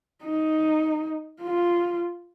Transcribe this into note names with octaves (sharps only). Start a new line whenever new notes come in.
D#4
F4